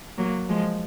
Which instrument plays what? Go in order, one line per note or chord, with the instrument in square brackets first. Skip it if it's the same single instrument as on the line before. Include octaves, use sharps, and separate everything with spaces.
[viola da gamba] F#3 A#3
F3 G#3